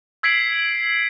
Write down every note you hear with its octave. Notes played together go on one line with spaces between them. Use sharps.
E6 G#6 B6 C7 D7 F#7